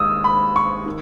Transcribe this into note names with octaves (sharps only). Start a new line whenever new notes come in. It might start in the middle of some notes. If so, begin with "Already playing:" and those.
Already playing: D#2 D#3 G#3 D#6 E6
B5
C#6
D#3